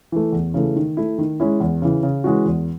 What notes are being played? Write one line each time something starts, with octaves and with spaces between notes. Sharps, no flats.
E3 A3
E2
C#3 E3 A3
D#3
A3 E4
D#3
G#3 C#4 E4
E2
C#3 E3
C#3
E3 G#3 C#4 F#4
E2